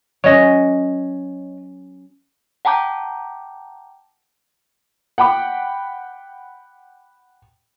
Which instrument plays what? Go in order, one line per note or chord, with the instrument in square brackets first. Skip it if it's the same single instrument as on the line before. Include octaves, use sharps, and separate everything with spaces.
[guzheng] F#3 C#4 [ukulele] C#5 D#5
[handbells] F#5 G5 A5 A#5 D6 G6
[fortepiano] F#5 G5 B5 D6